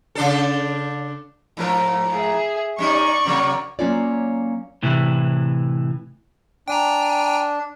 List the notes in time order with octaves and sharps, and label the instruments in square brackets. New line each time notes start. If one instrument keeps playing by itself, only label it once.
[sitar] C#3 D4 A4
G#2 F3 A#4
[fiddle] G#4 E5
[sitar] G3 C#4 D#4 [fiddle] D5 C#6
[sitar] C3 F#3 A#3
[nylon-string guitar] F#3 A#3 C#4 F4 C#5 D5
[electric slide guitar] A2 C3 E3 E4
[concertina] D4 [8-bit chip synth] G5 G#5 A#5